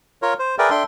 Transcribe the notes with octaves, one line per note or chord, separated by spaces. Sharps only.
F4 A#4 C#5
C5
G#4 A#4 B4 D5 E5 G5
D4 A4 E5 G5 C6